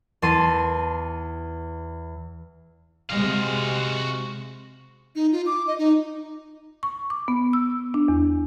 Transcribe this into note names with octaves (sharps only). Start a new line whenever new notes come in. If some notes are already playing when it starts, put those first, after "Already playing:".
E2 A5 C6 D#7
C3 G#3 F#4 F5
D#4
F4
D6
D#5
D#4
C#6
D6
B3
E6
D4
E2